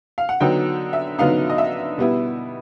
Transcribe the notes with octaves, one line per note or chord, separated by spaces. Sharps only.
F5
F#5
D3 F#3 B3 D#4 G5
E5
D3 F#3 B3 D#4 F5
D#5
E5
B2 G3 B3 E4